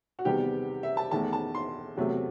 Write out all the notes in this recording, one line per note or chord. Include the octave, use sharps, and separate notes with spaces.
F#4
E2 C3 D#3 G3 B3 G4
E5
A5
E2 D#3 A3 A5
A5
C6
E2 C3 F#3 A3